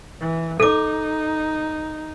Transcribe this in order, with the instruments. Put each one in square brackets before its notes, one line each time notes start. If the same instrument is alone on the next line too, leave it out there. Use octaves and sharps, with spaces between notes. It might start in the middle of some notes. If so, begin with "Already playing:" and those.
[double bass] E3
[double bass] D#4 [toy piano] A4 D6